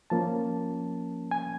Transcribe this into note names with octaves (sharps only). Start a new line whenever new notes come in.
F3 A#3 C#4 A5
G#5